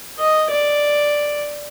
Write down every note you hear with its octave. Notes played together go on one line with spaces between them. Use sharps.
D#5
D5